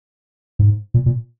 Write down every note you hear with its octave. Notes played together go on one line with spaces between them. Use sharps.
G#2
A#2
A#2